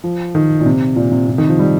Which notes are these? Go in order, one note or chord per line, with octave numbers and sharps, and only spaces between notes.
F3
D#3
A#2
C3
A#2
C3
C3
D#3
F3
G3